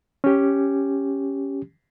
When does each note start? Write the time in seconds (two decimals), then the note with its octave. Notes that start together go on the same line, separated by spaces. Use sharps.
0.24 C#4 G4